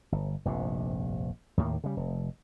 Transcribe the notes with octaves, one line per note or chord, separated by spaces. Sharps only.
G1
F1 A#1 G2 C3
D#2 A2 D#3 A#3
C#3 G3
F1